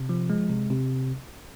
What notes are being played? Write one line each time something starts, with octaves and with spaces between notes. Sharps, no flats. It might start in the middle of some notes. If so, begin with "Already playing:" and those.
Already playing: C3
F3
G#3
C3
C3